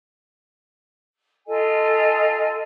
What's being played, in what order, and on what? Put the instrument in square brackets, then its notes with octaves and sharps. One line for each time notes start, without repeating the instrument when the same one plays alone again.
[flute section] F4 A4 D#5 G#5